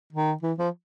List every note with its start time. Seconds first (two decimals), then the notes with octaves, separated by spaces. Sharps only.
0.13 D#3
0.43 E3
0.58 F3